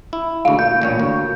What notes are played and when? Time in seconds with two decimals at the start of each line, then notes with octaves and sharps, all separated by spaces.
0.13 E4
0.45 D2 G#3 F5
0.59 A#2 G6
0.82 A1 A#2 C#5
1.00 D2